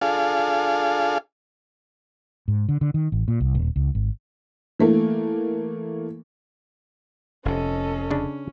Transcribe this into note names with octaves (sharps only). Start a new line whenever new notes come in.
D4 F4 G#4 A4 F5
G#2
D3
D3
D#3
A1
A#2
C2
D#1
C#2
G#1
E3 A3 A#3
F1 C3 C#4 A4 D#5
C#3 D4